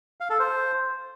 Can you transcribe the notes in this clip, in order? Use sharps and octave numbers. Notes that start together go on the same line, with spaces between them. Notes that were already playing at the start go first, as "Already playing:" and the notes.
F5
A4
C5